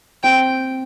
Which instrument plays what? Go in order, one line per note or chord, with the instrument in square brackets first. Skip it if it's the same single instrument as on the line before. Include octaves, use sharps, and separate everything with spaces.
[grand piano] C4 [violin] G5